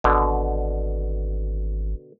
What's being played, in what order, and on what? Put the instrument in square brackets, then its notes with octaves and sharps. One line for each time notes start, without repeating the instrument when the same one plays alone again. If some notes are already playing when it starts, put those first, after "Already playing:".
[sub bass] G#1 [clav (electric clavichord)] B2 D3